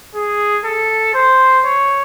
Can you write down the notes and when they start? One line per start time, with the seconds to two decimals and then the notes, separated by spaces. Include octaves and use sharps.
0.15 G#4
0.65 A4
1.14 C5
1.66 C#5